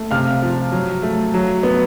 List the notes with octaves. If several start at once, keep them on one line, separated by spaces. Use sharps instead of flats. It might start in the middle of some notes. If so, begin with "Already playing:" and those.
Already playing: A3
C3 F5 F6
F3
F#3
A3
F#3
B3